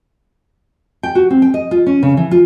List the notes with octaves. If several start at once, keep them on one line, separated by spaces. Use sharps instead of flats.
G5
F#4
C4
G5
D#5
F4
C#4
C#3
E3
F4